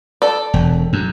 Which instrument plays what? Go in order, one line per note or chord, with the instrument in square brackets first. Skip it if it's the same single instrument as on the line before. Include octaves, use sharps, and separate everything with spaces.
[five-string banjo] A4 D5
[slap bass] E1
F#2